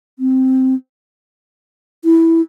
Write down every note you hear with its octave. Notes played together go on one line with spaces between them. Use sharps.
C4
E4